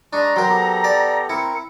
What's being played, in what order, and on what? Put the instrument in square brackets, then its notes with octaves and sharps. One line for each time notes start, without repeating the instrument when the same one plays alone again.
[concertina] G#3 C#6 D#6 [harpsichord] D4 [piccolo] A#5
[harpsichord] F#3 A#4 [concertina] C5 G5 C6
[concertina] B3 G4 A4
[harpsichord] D5
[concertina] C4 A#4 [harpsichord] E4 [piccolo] C#7